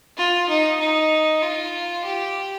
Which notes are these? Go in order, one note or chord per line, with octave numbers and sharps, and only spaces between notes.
F4
D#4
D#4
F4
G4